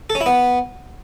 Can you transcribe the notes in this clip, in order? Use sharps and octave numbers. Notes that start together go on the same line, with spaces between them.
A4
C#4
E4
B3